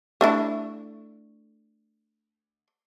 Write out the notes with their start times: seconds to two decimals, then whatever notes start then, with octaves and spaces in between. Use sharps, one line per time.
0.21 A3 D4 E4